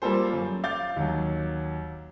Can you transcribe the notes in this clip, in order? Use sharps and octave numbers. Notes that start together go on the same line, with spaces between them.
G3 A#3 F4 A4 C5
F#2
F5 D6 G6 A6
D#2 F#3